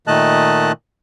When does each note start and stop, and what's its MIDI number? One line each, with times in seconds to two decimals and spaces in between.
0.07 0.72 46
0.07 0.72 51
0.07 0.72 57
0.07 0.72 75
0.07 0.72 81
0.07 0.72 90